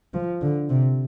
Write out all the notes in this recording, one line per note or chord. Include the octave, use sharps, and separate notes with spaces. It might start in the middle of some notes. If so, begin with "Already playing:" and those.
F3
D3
C3